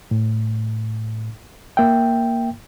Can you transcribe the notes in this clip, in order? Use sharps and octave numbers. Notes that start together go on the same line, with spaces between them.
A2
A#3 E5 G5